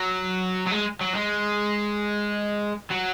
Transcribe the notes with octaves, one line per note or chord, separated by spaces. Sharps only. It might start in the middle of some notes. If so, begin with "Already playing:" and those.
Already playing: F#3
F#3
G#3
F#3
G#3
F#3